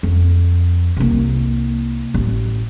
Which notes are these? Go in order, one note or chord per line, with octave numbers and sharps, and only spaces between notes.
F2
C2 A#3
A1